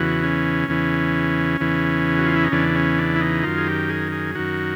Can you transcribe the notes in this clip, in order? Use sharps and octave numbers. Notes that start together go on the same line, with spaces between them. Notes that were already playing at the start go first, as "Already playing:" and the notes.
Already playing: E2 C#3 E3 F#4
C#4
E2 C#3 E3
E2 C#3 E3
F#4
F4
E4
D#4
E2 C#3 E3 D4
C#4
D4
E4
D#4
F#2 D#3 F4
G#4
G4
G#4
G#4
F#2 D#3 F#4